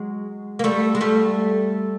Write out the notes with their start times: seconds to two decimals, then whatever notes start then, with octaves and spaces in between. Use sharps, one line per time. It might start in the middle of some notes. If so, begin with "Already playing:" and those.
Already playing: F#3 G#3
0.59 A#3
0.64 G3 A3
0.95 G#3
1.01 G3 A3